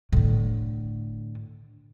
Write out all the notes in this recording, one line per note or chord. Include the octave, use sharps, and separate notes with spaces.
A2 D3